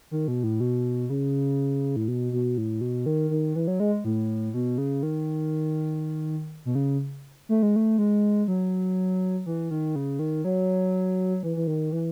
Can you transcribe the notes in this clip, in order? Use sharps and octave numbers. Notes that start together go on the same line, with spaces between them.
D#3
B2
A2
B2
C#3
A2
B2
B2
A2
B2
D#3
D#3
E3
F#3
G#3
A2
B2
C#3
D#3
B2
C#3
A3
G#3
A3
G#3
F#3
E3
D#3
C#3
D#3
F#3
E3
E3
D#3
E3